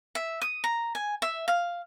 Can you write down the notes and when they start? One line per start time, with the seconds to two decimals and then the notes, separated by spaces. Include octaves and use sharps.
0.15 E5
0.42 D#6
0.64 A#5
0.95 G#5
1.22 E5
1.48 F5